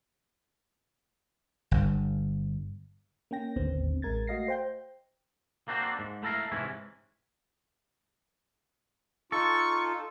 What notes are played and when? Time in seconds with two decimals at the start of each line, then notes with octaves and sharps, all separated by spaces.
1.71 G1 G2
3.31 A#3 C#4 G5 A#6
3.56 G#1 D#2 A2 D3 B3 C4
4.02 A1 G#3 A#4 G#6 A6
4.27 A3 F#4 D#5 F5 A#6 C7
4.48 C5 G5 G6
5.68 A#3 C4 D4 F#4 C5
5.99 G#2
6.23 A3 E4 A4 A#4 F5
6.52 G#2 C3 E3 C#4 E4
9.32 D#4 F4 A4 C#6